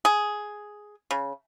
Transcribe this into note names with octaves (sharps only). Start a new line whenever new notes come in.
G#4
C#3